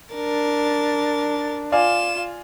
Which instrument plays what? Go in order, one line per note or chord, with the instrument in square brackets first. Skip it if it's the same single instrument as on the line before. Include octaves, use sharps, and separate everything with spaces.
[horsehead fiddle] D4 [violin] A#4 A6
[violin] F4 E7 [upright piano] D5 F5 G#5